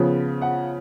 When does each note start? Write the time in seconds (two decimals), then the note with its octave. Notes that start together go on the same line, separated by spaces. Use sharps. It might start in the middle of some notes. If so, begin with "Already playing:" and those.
Already playing: C#3 F3 B3
0.42 F#5